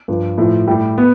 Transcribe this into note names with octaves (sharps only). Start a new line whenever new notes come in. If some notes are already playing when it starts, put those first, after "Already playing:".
G2 F3
A2 F3
A2 G3 G4
B3